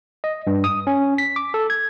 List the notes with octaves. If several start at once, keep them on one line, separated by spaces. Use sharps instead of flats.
D#5
G2
D#6
C#4
B6
D6
A4
G#6